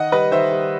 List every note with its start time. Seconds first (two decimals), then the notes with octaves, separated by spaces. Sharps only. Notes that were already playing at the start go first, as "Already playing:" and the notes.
Already playing: D#3 D#5 F#5
0.12 G3 B4 D#5
0.32 D#3 C5 E5
0.52 G3